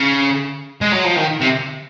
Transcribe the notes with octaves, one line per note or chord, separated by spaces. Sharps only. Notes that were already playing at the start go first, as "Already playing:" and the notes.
Already playing: C#3
G#3
F#3
F3
D#3
C3